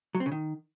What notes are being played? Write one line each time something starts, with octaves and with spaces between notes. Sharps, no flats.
F#3
C4
C#3
D#3